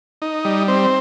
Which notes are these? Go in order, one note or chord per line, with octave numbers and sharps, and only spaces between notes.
D#4
G3
C4